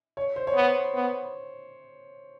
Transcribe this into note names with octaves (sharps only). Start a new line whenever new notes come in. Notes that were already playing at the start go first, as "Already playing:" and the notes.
C#5
C5
C#5
B3 C5
B3